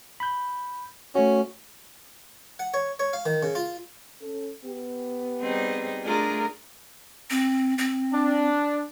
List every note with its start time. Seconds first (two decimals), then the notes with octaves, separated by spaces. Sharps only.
0.20 B5 G6
1.15 A3 C#4 F#4
2.59 F#5
2.74 C#5
2.99 C#5
3.13 F5
3.26 D#3
3.43 C#3
3.55 F4
4.21 C#4 A4
4.65 B3 G4
5.41 G3 C4 D#4 G#4
6.04 A3 D4 F4 G#4 A#4
7.30 C4
7.78 C4
8.13 D4